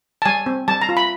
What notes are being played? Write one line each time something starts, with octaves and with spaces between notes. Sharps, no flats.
A5
G3 G#5
C4
G3 A5
A#5
F4
B5